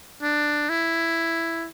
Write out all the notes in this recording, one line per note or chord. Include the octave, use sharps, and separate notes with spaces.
D4
E4